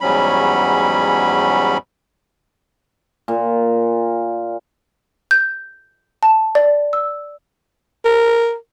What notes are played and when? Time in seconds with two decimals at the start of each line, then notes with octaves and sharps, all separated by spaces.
0.01 E2 G#2 F#3 G3 C#4 B5
3.28 A#2
5.31 G6
6.23 A5
6.55 D5
6.93 E6
8.05 A#4